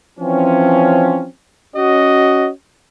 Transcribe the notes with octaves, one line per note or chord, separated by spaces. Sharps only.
E3 F3 C4 C#4
C#4 F#4 D#5